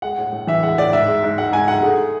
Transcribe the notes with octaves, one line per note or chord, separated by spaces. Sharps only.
G#3 F#5
A2
A2
E3 E5
G#3 F#5
A2 D5
G#2 E5
G#3
G#2
G#3 F#5
G#2 G#5
G#3 F#5
A3 G#4